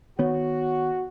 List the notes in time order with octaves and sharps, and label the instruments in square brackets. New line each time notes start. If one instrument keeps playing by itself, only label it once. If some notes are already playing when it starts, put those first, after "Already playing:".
[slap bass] D#3 B3 [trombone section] F#4 [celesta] C#5